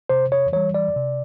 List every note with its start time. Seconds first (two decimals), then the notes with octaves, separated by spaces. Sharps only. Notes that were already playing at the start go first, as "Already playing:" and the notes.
0.10 C3 C5
0.32 C#5
0.53 E3 G3 C#5
0.74 D5
0.96 C3